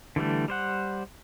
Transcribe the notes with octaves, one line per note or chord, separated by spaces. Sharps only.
D3 E3 G3 A3
G3 C5 F#5